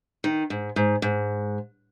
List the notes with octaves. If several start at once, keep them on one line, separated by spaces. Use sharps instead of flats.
D#3
G#2
G#2
G#2